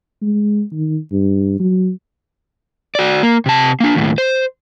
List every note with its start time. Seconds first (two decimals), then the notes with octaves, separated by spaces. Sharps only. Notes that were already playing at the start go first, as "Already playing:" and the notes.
0.22 G#3
0.72 D#3
1.11 G2
1.60 F#3
2.95 F#4 D5
3.23 A#3
3.46 C3 A5
3.80 A#3 D4
3.95 D#2 A2
4.18 C5